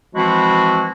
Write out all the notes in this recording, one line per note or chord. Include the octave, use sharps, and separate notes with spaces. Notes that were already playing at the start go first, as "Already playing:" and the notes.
E3 F3 G#3 C4 E4 F#4